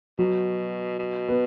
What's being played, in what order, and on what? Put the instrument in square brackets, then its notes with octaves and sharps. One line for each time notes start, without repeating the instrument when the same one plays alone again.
[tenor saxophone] B2 [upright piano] F#3
[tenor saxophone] B2
[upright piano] B3